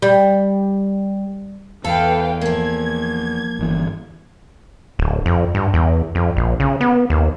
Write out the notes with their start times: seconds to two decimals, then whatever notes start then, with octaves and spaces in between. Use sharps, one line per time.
0.02 G3
1.84 E2 A4 B4 F5 G5
2.41 F3 A#3 G#6
3.59 G1 E3
4.99 D1
5.26 F2
5.55 G2
5.74 E2
6.15 F2
6.37 A#1
6.60 C#3
6.81 B3
7.10 D#2